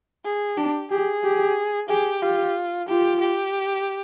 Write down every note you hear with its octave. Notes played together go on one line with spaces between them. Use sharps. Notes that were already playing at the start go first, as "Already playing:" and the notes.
G#4
D4 G4
G4 G#4
G4
G4 G#4
F4 G4
F4 G4
G4